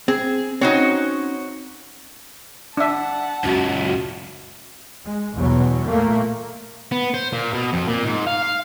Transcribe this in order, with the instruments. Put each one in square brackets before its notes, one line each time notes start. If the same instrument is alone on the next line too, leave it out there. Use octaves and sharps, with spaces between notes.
[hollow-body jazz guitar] C4 [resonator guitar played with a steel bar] G#4
[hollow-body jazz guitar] C4 C#4 [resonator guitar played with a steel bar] D#4 F#4 C#5
[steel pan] D4 E5 [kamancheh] F#5 A5
[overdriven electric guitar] C#2 F#2 [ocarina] F#4
[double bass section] G#3
E2 B2 F#3
A#2 A3 A#3
[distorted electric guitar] B3
C5
A#2
B2
F2
A#2
G#2
F5
F5